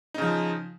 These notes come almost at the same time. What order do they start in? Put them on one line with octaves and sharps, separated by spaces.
D#4 C#3 F3